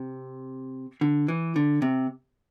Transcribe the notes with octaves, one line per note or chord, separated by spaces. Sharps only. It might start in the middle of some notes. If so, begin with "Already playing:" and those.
Already playing: C3
D3
E3
D3
C3